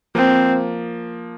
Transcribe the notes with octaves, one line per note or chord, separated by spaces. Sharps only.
F3 A#3 C4